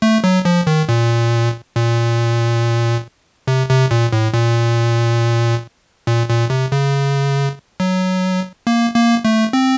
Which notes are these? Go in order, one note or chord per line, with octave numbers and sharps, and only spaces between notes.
A3
F#3
F3
D#3
A#2
A#2
C3
C3
A#2
A2
A#2
A#2
A#2
C3
C#3
F#3
A#3
A#3
A3
C4